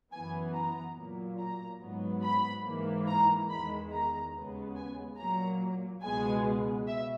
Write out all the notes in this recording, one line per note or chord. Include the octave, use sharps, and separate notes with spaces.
F#2 E3 B3 G#5
A#5
A#2 F#3 A#3
A#5
G#2 F#3 B3
B5
G#2 E3 A#3
A#5
E2 D#3 G#3 B5
A#5
D#2 C#3 G#3 B3
G#5
A#2 F#3 A#3 A#5
C#2 B2 G#3 B3 G#5
B2 E5